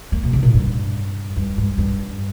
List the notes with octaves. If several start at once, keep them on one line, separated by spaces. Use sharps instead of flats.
A#3
B2
C#3
A#2
G2
G2
G#2
G2